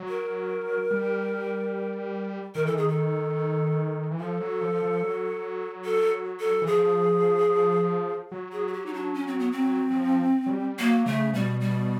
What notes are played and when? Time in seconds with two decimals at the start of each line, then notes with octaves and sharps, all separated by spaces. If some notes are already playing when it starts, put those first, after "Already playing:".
Already playing: F#3
0.08 A#4
0.91 G3
2.55 D#3 A#4
2.65 E3 A4
2.74 D#3 G#4
2.88 A4
4.11 E3
4.20 F3 A4
4.41 F#3
4.61 F3
4.82 F3
5.03 F#3
5.85 A4
6.40 A4
6.62 E3
6.67 F3 G#4
8.32 F#3
8.52 G#4
8.68 G#4
8.73 G4
8.86 D#4
8.94 D4
9.14 C#4
9.27 C4
9.39 B3
9.52 C4
9.90 F#3
9.96 F3
10.46 F#3
10.50 G3
10.79 F#3 A#3
11.06 C#3 A3
11.33 B2 G3
11.61 G3